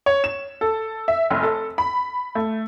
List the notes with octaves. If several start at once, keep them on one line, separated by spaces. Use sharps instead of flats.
C#5
E7
A4
E5
F1
A4
B5
A3